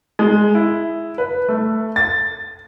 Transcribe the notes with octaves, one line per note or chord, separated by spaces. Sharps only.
G#3
E4
B4
A3
A6